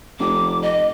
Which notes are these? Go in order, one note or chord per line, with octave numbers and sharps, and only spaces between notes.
F1 D6
D#5